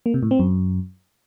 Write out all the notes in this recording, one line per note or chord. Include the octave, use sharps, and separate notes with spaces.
A#3
C3
A2
C4
F#2